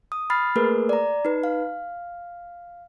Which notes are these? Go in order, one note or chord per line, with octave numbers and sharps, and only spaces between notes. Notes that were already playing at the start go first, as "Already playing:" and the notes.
D#6
B5 F6 A6 C7
A3 A#3 G#4 A#4 B4
D5 A#5
D#4 B4
F5